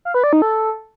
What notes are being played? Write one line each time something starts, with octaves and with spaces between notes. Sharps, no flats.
F5
B4
D5
D#4
A4